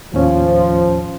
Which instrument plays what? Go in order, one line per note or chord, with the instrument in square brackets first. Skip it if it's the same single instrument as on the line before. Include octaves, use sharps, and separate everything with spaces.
[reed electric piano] D#2 A2 C#4 [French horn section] F3